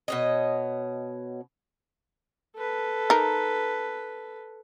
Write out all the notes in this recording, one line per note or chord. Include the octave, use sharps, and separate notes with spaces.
B2 C#5 D#5
A4 B4
D#4 A#4